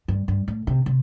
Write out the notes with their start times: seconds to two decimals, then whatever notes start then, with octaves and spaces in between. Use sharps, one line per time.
0.08 G2
0.28 G2
0.48 A2
0.67 C3
0.86 C3